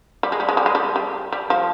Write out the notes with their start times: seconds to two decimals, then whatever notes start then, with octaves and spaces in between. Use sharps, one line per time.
0.23 G3
0.32 G#3
0.40 G3
0.49 G#3
0.57 G3
0.66 G#3
0.75 G3
0.96 G3
1.32 G3
1.50 F3